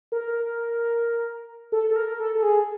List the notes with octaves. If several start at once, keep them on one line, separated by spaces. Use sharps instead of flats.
A#4
A4
A4
A#4
A4
A4
G#4